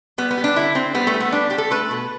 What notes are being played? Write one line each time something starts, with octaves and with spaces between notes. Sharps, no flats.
G3 B3
B3
G3
D4
D3 E4
D3 C4
G3 B3
A3
G3
B3
G3 D4
G3 G4
A4
A3 B4
B2